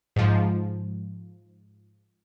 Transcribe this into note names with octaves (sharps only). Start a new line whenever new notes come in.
G#2 F3